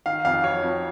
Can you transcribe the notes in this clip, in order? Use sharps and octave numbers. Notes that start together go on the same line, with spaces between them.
D#3 F5
F2 F5
F#3 C#5
F2